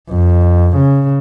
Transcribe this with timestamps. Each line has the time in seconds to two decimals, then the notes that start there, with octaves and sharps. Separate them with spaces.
0.10 F2
0.76 C#3